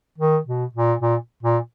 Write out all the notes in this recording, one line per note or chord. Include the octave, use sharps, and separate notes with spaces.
D#3
B2
A#2
A#2
A#2